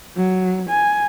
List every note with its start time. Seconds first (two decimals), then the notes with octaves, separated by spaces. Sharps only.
0.17 F#3
0.70 G#5